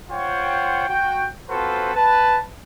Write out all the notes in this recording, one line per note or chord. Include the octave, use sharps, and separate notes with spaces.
F4 C5 C#5 F#5 G5
F#4 G5
C4 F4 F#4 A4 B4 C5
B4 A5